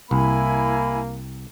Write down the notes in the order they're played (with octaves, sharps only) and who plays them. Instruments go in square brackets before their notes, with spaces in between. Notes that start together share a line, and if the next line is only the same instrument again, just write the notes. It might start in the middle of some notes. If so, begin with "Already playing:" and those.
[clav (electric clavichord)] C2 [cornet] A#3 [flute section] E4 G#5 B5